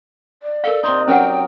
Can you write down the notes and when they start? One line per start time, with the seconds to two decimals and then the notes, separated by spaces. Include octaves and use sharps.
0.43 D5
0.64 A4 A#4 F5
0.83 C3 D#4 C6
1.08 F#3 C#4 A#4 B4 F#5 G5